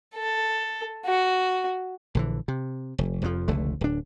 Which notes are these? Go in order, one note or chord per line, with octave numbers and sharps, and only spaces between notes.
A4
F#4
A#1 D3 E3
C3
F1
F1 F2 C#3 F3
F1 C#2 D3 A3
D1 D4